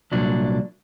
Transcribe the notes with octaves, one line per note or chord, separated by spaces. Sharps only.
C2 A#2 F#3 D4